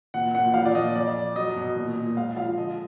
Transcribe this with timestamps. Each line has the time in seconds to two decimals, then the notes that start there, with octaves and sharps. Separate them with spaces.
0.14 A#2 F#5
0.35 A#2 F#5
0.54 F3 F5
0.65 D5
0.74 A#2 D#5
0.95 F2 D5
1.15 F2
1.36 F#3 D#5
1.56 B2
1.76 A#2
1.96 A#2
2.17 G#3 F5
2.36 F3 F5
2.57 D3 D#5